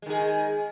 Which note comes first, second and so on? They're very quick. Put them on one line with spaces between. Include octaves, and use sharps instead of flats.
G#3 D#3 G#4